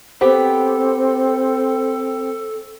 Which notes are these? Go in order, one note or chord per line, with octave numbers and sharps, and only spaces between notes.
B3 C4 G4 A4 C5